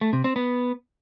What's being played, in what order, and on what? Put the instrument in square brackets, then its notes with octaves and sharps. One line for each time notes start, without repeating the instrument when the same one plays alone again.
[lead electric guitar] A3
C3
C4
B3